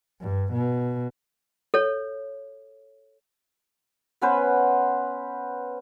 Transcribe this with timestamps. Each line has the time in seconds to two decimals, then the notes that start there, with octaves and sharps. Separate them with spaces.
0.21 G2
0.53 B2
1.74 A4 C#5
4.21 B3 C#4 B4 C5